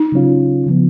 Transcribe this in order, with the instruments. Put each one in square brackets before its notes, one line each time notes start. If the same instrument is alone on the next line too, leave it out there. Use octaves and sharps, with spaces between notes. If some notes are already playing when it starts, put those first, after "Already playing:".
Already playing: [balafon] D#4
[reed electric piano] C#3 F#3 C#4 F4
C#3 F3 B3